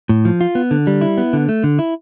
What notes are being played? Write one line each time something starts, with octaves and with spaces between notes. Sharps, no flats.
A2
F3
F4
B3
D3
G3
E4
B3
D3
A3
D3
E4